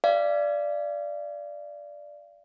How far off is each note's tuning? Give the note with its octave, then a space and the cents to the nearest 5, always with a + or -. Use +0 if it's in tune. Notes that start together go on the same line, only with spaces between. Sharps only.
D5 +0 F5 -35